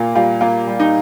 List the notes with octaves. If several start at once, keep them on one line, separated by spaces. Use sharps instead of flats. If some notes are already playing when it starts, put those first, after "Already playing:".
Already playing: A#2 A#3 F4
G3 F4
A#3 F4
G3
D#4